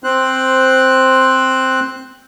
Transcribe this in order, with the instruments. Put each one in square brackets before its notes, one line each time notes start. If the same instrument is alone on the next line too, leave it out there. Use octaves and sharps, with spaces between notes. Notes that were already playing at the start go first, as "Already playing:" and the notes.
[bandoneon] C4 C5 F#6